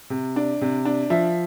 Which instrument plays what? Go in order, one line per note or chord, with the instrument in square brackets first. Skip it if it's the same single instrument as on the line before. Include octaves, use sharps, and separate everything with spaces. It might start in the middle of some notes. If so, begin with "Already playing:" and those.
[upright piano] C3
D4
C3
D4
F3 E5